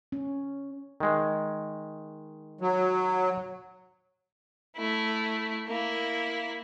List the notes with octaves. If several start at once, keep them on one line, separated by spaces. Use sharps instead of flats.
C#4
D#3 G#3
F#3
A3 E4
A#3 E4